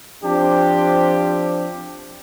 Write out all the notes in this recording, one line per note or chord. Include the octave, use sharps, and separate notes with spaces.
F3 C4 D4 G4